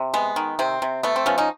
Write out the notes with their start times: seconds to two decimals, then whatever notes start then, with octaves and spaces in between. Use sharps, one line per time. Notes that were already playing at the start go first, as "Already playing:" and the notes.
Already playing: C3
0.14 G#3 B3
0.36 D#3
0.59 C3 C4
0.82 C3
1.03 A3 B3
1.16 C4
1.26 F3 B3 C#4
1.38 C#4 D#4